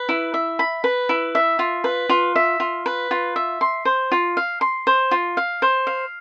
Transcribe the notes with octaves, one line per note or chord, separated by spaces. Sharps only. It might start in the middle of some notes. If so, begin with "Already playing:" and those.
Already playing: B4
E4
E5
B5
B4
E4
E5
F4
B4
F4
E5
F4
B4
F4
E5
C6
C5
F4
F5
C6
C5
F4
F5
C5
F5